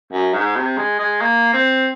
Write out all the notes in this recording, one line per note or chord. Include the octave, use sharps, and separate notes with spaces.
F#2
G#2
C3
G#3
G#3
A#3
C4